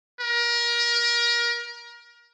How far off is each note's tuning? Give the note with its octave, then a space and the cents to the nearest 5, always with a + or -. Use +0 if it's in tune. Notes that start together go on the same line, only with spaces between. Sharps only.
A#4 +30